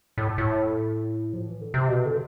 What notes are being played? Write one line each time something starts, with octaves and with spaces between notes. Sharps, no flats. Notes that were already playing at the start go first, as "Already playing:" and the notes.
A2
A2
F3
E3
D3
C3
B2
D3